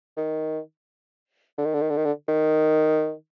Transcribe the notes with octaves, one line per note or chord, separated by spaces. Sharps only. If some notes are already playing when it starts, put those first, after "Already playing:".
D#3
D3
D#3
D3
D#3
D3
D#3
D3
D#3